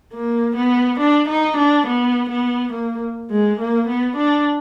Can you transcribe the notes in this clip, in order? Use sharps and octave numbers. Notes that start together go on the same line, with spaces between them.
A#3
B3
D4
D#4
D4
B3
B3
A#3
G#3
A#3
B3
D4